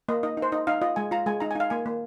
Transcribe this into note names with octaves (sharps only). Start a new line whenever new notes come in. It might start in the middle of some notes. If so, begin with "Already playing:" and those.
A#3 D#5
D#4 D#5
D#4
C5
D#4 D#5
D#4 F5
F4 D#5
G#3 G#5
F4 A#5
G#3 G#5
D#4 A#5
G#5
D#4 F5
A#3 G#5
A#3